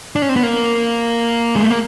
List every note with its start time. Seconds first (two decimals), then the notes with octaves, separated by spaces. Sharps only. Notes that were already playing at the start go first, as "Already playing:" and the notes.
0.16 D4
0.22 C#4
0.29 C4
0.36 B3
0.43 A#3
1.56 G#3
1.63 A3
1.71 A#3